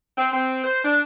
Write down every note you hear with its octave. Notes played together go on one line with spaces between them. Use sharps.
C4
C4
C5
D4